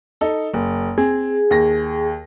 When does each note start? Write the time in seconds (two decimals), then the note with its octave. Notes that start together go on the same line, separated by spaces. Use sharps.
0.21 D#4 A4
0.54 F#1
0.98 C4 G#4
1.51 D#2 A#6